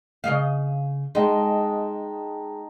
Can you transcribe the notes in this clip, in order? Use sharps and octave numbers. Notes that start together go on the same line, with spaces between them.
C#3 D#5 F5
G#3 D#4 G5 A5